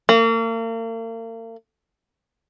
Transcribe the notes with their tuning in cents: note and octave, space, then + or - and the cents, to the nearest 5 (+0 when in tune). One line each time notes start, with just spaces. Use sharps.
A#3 -40